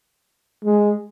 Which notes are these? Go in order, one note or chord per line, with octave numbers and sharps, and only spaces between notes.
G#3